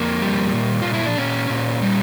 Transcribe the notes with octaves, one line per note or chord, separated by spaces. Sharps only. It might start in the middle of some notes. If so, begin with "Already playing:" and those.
Already playing: F2 A#3
G3
A#2
A#2 F4
E4
D4
A#2 C#4
A#2
G3